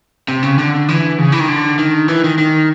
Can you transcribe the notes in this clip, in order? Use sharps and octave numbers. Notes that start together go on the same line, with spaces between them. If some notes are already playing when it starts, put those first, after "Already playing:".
C3
C#3
D3
E3
C#3
E3
D#3
D3
D#3
E3
D#3
D#3